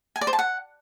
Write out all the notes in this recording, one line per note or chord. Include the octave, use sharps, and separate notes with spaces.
G#5
D5
C5
A5
F#5